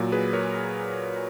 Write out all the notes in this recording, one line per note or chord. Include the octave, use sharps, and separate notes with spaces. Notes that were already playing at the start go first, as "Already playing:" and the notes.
Already playing: A#2 F#3
G#4 B4
A#4 C#5